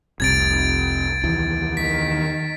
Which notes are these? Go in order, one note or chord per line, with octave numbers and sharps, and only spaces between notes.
F1 C2 C3 G#6 A6 D7
D#2 E3
D#3 B6